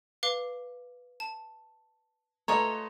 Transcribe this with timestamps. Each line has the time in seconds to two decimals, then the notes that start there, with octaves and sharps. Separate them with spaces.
0.23 B4 F5 D6
1.20 A5
2.48 A3 F4 A4 B4 C#5 D#5 A#5